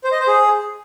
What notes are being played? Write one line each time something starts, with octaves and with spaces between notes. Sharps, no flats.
C5
D#5
C5
G#4